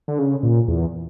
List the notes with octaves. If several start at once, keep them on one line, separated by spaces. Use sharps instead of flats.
D3
C#3
A#2
E2